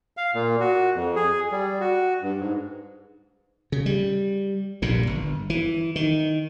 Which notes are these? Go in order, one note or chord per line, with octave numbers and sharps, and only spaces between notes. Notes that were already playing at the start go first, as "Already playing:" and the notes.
F5
A#2
F#4
F2
G#4
G3
F#4
G2
G#2
C#3
G3
A#1 G2 A#2
G1
E3
D#3